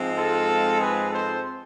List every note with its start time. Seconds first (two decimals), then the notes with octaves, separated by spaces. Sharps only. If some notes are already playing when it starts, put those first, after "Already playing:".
Already playing: G#2 F3 G#3 C4
0.16 F4 A4
0.79 G#4 B4
1.11 A4 C5